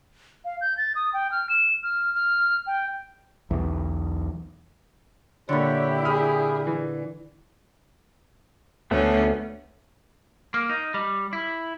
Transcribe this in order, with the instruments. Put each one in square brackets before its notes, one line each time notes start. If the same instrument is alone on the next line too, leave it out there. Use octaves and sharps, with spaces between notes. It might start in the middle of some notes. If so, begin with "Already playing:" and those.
[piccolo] F5
G6
A6
D#6
G5
F6
E7
F6
F6
G5
[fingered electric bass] B1 E2
[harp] A#2 D3 [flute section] E4 G4 [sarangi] C#5
[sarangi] G#4 [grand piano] B5 D#6 F6
[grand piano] E3
[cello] D2 C#4 [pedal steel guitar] A3 B3
[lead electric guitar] A#3
D#4
G3
E4